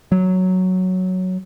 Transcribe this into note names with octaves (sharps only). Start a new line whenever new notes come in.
F#3